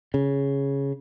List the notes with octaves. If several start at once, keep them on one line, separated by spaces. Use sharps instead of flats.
C#3